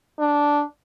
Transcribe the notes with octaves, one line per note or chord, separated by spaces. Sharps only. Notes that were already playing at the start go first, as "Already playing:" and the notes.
D4